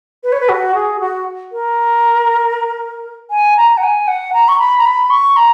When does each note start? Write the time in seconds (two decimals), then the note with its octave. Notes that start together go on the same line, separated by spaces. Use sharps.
0.23 B4
0.32 C#5
0.40 B4
0.48 F#4
0.74 G#4
1.00 F#4
1.52 A#4
3.30 G#5
3.57 A#5
3.77 F#5
3.83 G#5
4.07 F#5
4.33 A#5
4.48 C#6
4.58 B5
4.78 A#5
4.85 B5
5.10 C#6
5.36 A#5